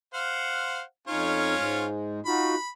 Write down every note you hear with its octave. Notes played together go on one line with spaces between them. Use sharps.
C5 F5 F#5
F2 C#4 D#4 F4 C#5
G#2 G#3
D#4 F4 F#4 B5